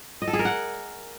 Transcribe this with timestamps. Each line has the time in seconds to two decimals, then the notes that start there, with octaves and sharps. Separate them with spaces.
0.22 D#5
0.28 A4
0.33 G#4
0.39 A#4
0.45 F#5